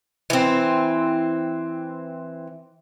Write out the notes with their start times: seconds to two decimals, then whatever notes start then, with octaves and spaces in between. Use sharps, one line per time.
0.30 E3 C4